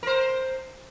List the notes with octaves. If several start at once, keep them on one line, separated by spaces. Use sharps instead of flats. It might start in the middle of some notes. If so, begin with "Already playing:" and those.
A#4 C5